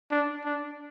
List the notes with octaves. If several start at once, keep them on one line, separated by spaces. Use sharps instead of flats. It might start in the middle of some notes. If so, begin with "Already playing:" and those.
D4
D4